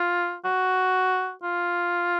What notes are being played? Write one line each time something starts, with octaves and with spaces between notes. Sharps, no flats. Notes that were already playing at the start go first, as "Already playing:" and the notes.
Already playing: F4
F#4
F4